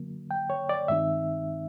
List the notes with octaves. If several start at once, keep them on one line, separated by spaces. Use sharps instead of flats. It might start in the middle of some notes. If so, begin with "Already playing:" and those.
Already playing: D3 F#3 A#3
G5
C#5
D5
G2 D#3 G#3 C4 D#4 E5